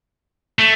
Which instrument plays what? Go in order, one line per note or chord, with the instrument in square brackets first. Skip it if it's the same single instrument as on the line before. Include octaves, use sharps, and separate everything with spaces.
[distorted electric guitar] A3